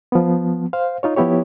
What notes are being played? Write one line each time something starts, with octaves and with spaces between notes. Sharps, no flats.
F3 B3
C5 F5
D#4 F4 C#5
F3 B3 E4 G4 C#5